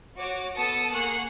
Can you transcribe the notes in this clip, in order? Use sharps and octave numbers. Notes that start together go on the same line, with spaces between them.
F#4 C#5 D6
B3 A4 A5 D#6 C#7
A#3 G#4 F#5 C#6 F#6